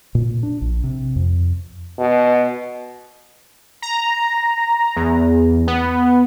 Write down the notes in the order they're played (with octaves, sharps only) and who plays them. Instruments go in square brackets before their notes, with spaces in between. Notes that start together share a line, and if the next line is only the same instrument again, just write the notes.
[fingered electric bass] A#2
D4
A#1
C3
F2
[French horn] B2
[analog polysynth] A#5
E2
B3